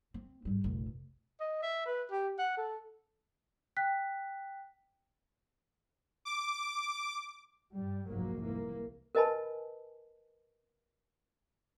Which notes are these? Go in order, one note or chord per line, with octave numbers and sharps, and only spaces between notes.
C4
G#2 G3
F1 A#1
D#5
E5
B4
G4
F#5
A4
G5 F#6 B6
D6
G2 G3
F1 B1 G#2 F#3 A#3
C2 E3 A#3
A#4 B4 D#5 G#5 A5 B5